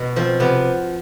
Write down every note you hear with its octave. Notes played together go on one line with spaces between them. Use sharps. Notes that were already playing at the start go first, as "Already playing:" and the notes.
Already playing: B2
F3 C4
C3 B3